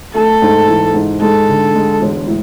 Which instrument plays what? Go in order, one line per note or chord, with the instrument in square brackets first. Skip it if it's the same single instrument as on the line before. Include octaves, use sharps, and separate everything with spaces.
[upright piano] A3 [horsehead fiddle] A4
[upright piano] G#2
E3
G#2
[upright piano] G#3 [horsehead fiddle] A4
[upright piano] D3
G#3
E1
A2